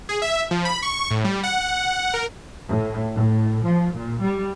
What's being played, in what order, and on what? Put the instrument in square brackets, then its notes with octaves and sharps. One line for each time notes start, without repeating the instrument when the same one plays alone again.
[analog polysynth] G#4
E5
F3
B5
C#6
A2
G3
F#5
A#4
[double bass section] A2
A2
F3
A#2
G3